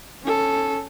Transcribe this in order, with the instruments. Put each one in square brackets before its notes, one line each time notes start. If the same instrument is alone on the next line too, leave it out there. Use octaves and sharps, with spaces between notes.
[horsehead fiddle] C#4 A4